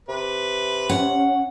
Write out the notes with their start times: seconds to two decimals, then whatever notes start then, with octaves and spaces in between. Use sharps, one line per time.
0.09 C3 B4
0.89 C#4 F#5